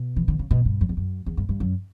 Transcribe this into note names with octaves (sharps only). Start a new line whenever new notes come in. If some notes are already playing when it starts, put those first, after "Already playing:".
Already playing: B2
E3
D3
C#3
B2
G2
F#2
E2
F#2
E2
G2
G2
F#2